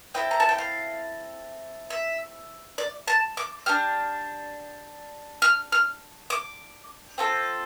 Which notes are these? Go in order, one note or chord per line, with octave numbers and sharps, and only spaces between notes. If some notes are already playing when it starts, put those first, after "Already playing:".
C4 E4 A4 G5
A#5
A5
G5
F5
E5
D5
A5
D6
D4 G4 F6
F6
F6
D6
C4 F4 A4